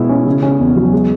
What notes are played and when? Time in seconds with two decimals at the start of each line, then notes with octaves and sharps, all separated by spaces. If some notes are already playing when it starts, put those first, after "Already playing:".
Already playing: B2 G#3 E4
0.09 C#4
0.26 C#3
0.42 C#4
0.60 E2
0.76 F#3
0.93 G#3